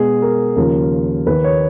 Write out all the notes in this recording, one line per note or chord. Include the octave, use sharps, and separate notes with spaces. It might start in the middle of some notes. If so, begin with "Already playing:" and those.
Already playing: B2 G#3 B3 G#4
A#4
D#2 C#3 F3 A#4
D#2 D#3 A#3 B4
C#5